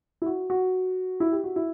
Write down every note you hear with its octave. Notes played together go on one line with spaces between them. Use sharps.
E4
F#4
F#4
E4
G4
F#4
E4